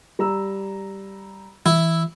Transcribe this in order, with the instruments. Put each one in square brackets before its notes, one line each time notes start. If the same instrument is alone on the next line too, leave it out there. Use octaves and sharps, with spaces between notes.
[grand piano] G3 A#5 E6
[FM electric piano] E3 [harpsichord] E4